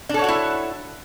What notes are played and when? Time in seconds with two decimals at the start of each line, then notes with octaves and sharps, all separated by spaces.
0.09 D4
0.14 A4
0.19 C#5
0.24 F#4
0.28 E4